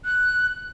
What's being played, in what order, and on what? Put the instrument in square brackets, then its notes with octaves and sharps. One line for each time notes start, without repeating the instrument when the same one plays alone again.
[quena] F#6